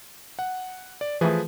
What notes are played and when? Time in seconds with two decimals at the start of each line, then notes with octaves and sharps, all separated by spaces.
0.39 F#5
1.01 D5
1.21 E3 F3 A3 G#4 B4